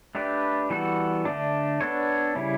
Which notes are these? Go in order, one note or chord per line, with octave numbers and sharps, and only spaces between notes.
A3 D4 G4 B4
E3 G3 B3 F#4 A4
D3 A3 D4
B3 D4 A4 C#5
C#3 G3 C#4 E4